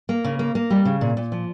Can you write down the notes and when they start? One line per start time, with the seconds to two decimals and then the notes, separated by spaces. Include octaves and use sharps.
0.09 A#3
0.24 C#3
0.39 A#3
0.55 A#3
0.70 G3
0.85 C#3
1.01 A#2
1.17 A#2
1.32 F3